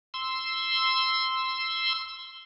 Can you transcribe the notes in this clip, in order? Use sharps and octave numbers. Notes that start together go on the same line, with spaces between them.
C6 E6